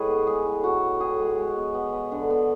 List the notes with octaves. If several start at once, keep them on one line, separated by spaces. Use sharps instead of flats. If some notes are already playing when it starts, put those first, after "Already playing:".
Already playing: A2 G#3 G#4 B4 C#5
B3
G#3 G#4
A2
A2 F#4
B3
A2 G#4
G#3
G#3
B3
B3
B3
D3
B3